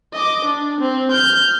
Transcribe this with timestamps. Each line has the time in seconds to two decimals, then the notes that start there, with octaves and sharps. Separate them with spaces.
0.13 D#5 D6
0.45 D4
0.81 C4
1.11 F6 G6